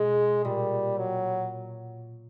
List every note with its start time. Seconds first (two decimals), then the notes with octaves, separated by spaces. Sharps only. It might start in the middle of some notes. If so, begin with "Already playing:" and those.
Already playing: B2 G#3
0.45 A#2 G3
0.97 F#3